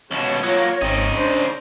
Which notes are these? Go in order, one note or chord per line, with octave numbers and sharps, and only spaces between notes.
C#2 B2 C#5
F#3 A#3 F4
G#1 C#3 C4 D#4
D4 C5